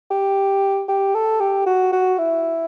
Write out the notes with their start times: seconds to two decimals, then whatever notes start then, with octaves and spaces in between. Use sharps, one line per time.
0.11 G4
0.88 G4
1.15 A4
1.40 G4
1.66 F#4
1.92 F#4
2.18 E4